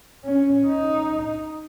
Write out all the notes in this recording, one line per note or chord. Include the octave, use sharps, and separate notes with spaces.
C#4
D#4